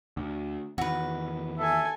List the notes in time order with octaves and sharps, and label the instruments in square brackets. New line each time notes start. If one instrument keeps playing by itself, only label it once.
[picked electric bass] D2
[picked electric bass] E2 D#3 [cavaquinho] F#4 B4
[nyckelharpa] A4 G#5 [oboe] E5